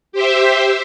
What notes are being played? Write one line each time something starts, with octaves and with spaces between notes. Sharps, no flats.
G4 C5 E5